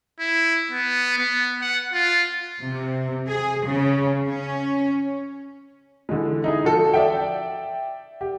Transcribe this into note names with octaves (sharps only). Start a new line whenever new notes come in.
E4
B3
B3
F#5
F4
C3
G#4
C#3
C#4
D3 E3 G#3
D#4 E4 G#4
F3 F#4 A4
D5 E5 G5
G4